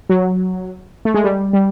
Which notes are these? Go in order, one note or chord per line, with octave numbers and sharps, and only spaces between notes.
F#3
A3
G#3
G3
G3